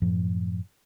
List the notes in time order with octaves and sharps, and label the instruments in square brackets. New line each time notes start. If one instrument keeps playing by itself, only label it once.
[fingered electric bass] F#2 A2 F3